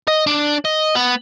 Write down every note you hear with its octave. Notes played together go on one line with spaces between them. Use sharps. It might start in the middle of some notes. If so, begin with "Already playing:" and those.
D#5
D4
D#5
B3